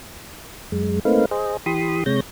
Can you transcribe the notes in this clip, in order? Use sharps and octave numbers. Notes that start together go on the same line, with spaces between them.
F#2 G#3
A3 A#3 C4 D#4 B4 F5
G#4 C5 D#5
E3 G4 B5 C6 D#6
C3 G#3 C#5 G6 A#6